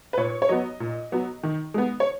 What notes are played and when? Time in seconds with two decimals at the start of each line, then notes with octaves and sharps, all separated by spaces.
0.13 B4
0.17 A#2 C#5
0.42 C#5
0.49 F#3 B3 D#5
0.80 A#2
1.12 F#3 B3
1.43 D#3
1.74 G#3 B3
2.00 C#5